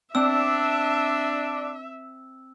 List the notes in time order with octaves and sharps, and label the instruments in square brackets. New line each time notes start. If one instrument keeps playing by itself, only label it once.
[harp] C4 [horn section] D4 [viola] E5 [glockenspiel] E6